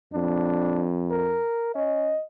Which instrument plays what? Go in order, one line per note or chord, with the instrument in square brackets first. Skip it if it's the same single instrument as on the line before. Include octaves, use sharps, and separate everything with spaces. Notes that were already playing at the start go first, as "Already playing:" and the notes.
[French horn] F2 [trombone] D4
[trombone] A#4
[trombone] C#4 [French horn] D#5